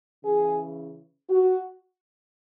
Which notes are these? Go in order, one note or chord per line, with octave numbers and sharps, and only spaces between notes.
C#3 E3 G#4
F#4